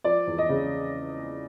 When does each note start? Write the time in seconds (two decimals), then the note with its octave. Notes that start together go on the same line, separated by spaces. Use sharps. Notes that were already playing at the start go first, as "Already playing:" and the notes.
0.04 F3 D5
0.27 E2
0.38 D#5
0.49 C#3